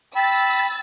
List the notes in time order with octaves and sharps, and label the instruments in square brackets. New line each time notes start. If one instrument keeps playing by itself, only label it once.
[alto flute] G5 [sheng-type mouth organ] B5 [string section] E6 A6